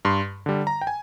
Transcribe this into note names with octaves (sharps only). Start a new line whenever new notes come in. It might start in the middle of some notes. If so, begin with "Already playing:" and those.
G2 C6
D3 G3
A#5
G5
G#5